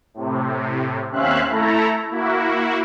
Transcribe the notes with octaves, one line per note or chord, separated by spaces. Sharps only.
A2 C3
D#2 C4 C#4 E5 F5 F#6
A3 E4 A4 A#5
A#3 E4 F#4